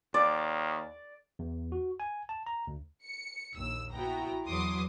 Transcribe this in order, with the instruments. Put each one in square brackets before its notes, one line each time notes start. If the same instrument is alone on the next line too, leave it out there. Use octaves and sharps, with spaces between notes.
[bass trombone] D#2 [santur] D5
[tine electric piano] E2
F#4
G#5
A5
A#5
D2
[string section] C#7
A#1 D#2 E6
B3 E4 F#4 G5 A#5
E2 E3 F#3 C6 D6 D#6